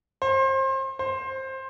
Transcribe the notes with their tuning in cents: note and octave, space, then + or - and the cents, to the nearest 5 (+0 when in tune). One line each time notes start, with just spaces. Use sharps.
C5 +30
C5 +15